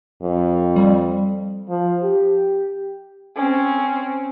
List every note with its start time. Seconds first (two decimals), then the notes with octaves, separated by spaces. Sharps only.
0.22 F2
0.76 G3
1.69 F3
2.03 G4
3.36 C4 C#4